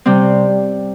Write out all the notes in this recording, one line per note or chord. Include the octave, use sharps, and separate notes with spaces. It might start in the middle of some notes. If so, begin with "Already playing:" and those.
C3 G3 C4